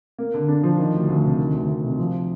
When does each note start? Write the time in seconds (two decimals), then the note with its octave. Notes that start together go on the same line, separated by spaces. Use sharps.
0.18 A#3
0.34 D3
0.48 D4
0.63 F3
0.78 D#3
0.94 D2
1.09 D2
1.24 C3
1.39 D#3
1.53 D2
1.69 A3
1.84 C3
1.99 F3